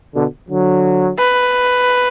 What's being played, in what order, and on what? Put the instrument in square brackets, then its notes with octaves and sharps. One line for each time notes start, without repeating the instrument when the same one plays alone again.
[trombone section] B2 D3
D3 F#3
[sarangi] B4